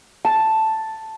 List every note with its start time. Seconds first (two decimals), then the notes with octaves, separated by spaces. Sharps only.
0.25 A5